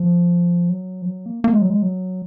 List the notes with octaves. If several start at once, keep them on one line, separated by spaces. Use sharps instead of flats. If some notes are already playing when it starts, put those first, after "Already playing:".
Already playing: F3
F#3
F3
F#3
A#3
A#3
G#3
F#3
G#3
F#3